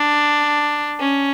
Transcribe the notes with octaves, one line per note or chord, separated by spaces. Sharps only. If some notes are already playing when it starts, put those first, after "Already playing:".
Already playing: D4
C#4